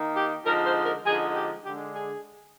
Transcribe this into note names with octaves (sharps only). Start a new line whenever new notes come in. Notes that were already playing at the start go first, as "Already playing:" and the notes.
Already playing: D#3 A#3 D#4
G4
D3 F3 G#3 D#4 A#4
C5
A#4
D3 F3 G#3 D#4 G#4
G4
D3 G#3 D4 G4
G#4